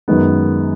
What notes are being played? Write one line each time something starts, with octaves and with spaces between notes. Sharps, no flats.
F#2 D#3 G#3 B3